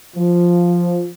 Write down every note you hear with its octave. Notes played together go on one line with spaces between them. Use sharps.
F3